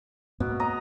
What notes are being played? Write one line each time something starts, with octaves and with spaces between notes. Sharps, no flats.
G#2 B2 A#3 C4
D#5 A#5